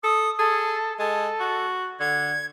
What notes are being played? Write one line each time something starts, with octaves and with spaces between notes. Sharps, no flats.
A4 D#6
G#4 A4
G#3 A4
F#4
D3 G#6